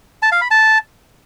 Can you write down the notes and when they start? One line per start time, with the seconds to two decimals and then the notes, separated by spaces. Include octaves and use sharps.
0.22 A5
0.32 F5
0.41 B5
0.51 A5